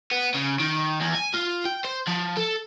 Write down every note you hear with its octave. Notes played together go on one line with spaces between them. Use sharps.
B3
C#3
D#3
E2
G#5
F4
G5
C5
F3
A4